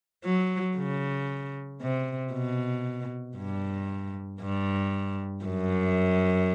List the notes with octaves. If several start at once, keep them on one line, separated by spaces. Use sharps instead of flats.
F#3
C#3
C3
B2
G2
G2
F#2